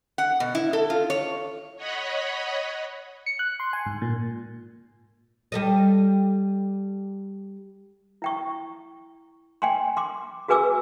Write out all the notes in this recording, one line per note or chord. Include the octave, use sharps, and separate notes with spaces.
F#5
B2
E4
A4
F4
C#5
C#5 D#5 F#5 B5
C#7
F#6
C6
G#5
G#2
A#2
G3 A4 D#5
E4 G5 C#6
G5 G#5 C6
C6 D6
F#4 G#4 B4 G#5 D6 E6